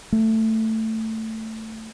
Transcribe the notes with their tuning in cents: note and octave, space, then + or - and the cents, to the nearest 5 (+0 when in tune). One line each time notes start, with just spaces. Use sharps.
A3 +10